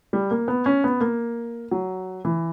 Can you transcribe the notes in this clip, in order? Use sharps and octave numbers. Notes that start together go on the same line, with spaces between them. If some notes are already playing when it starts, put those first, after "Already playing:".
G3
A#3
B3
C#4
B3
A#3
F#3
E3